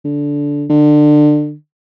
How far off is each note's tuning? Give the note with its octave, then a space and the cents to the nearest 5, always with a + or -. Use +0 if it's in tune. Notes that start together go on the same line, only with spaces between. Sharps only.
D3 -15
D3 +25